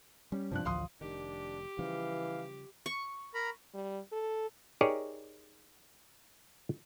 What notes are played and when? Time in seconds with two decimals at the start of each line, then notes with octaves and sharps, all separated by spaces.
0.32 G3 C#4
0.51 G2 C3 F3 D4 F#6
0.65 A1 D2 F3 F5 C6 D#6
1.01 F1 D#3 D4 G4
1.79 C#3 E3 F3 G3 F5
2.86 C#6
3.34 A#4 A#5 B5
3.74 G3
4.12 A4
4.81 D#4 G4 G#4 A#4 C#5 D5